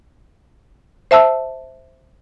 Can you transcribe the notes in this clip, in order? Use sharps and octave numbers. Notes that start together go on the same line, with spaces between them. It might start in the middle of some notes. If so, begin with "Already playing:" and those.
C5 E5 A5 E6